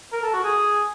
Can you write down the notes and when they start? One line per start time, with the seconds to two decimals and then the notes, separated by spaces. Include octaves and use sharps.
0.13 A#4
0.23 A4
0.33 F#4
0.44 G#4